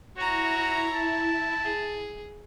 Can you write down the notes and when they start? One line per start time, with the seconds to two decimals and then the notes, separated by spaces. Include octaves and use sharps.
0.17 E4 F#4 C#5 A#5
0.94 A5
1.64 G#4